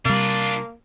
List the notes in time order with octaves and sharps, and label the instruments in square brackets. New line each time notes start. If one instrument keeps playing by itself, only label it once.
[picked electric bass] C3 G3 [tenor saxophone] A#3 [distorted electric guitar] D4 F4